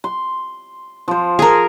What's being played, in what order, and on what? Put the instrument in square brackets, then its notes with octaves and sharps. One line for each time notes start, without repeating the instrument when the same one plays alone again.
[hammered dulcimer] C6
F3 C5
[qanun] G#4 A#4